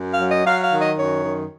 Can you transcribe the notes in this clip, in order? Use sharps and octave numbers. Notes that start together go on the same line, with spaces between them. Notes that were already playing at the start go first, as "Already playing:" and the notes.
Already playing: F#2
F5
F#3
D#5
F#3 F5
F5
D#3
D#5
F#2 C#5
D#3